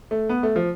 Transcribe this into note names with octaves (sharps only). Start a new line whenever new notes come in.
A3
B3
A3
F3